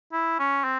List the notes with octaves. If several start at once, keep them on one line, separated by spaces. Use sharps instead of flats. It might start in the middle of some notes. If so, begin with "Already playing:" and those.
E4
C#4
C4